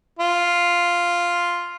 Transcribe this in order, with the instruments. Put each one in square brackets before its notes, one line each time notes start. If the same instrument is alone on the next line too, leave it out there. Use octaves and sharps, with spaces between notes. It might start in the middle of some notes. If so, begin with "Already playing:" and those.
[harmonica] F4